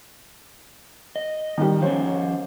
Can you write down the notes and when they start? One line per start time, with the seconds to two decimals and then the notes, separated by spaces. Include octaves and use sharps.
1.16 D#5
1.58 D#3 G3
1.82 F3 C#4 C5 C#5